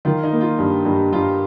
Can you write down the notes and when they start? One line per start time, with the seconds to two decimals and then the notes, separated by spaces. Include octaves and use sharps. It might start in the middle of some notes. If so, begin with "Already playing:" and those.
0.05 D#3 F4
0.23 D#4
0.32 A#3
0.41 F4
0.58 G2
0.85 G2
1.12 G2 F4